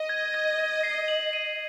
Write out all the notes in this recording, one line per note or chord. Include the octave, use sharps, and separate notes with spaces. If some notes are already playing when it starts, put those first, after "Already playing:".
Already playing: D#5
G#6
G#6
G#6
C7
F#7
D#7